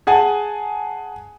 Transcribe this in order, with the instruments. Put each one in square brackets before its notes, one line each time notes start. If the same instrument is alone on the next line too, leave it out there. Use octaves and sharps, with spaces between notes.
[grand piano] G#4 F#5 G#5 A5